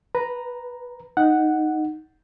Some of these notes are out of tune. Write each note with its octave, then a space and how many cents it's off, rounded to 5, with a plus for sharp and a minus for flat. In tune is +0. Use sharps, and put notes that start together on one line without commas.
B4 +0 A#5 +0
D#4 +0 F#5 +0